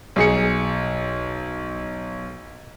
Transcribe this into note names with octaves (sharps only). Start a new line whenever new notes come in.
B1 G#4 C#7